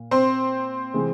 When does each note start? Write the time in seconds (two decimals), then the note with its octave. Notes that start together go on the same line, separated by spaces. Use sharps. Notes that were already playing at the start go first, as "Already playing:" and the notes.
Already playing: A#2
0.11 C4 C5
0.94 C3 E3 G#3